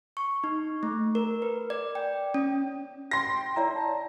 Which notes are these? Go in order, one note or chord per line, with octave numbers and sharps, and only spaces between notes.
C#6
D#4
A3
A#4
B4
D5
G5
C#4
G5 C6 A#6
E4 C#5 D5 A#5
A5